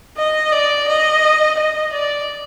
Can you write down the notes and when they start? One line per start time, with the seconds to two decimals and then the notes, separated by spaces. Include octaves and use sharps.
0.18 D#5
0.52 D5
0.87 D#5
1.57 D#5
1.93 D5